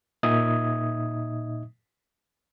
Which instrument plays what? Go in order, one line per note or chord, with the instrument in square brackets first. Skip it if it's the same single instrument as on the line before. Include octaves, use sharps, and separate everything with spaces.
[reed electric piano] A#2 D#4 D#5 E5 D#6 G#6